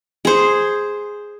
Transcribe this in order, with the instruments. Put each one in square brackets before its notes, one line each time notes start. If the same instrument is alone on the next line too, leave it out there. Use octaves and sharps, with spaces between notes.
[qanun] G#4 C5